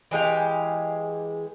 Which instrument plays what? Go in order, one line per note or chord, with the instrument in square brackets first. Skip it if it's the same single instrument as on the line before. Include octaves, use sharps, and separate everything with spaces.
[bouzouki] E3 G#3 G4 F5